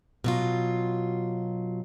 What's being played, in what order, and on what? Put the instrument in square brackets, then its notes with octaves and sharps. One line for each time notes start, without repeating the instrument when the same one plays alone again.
[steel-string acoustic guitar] B2 F#3 F4